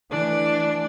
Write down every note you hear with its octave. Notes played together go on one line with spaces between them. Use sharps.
E3 A3 D4